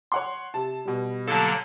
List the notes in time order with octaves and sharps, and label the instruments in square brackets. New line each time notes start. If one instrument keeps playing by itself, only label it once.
[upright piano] C#5 F#5 C6
C3 A5
B2 G3
[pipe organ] D3 F#3 A#3 [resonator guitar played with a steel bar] A4 A5